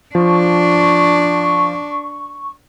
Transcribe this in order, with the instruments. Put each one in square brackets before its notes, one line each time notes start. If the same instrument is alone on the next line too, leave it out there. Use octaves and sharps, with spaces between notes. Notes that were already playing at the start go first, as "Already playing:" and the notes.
[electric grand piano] F3 [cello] D4 [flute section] C#6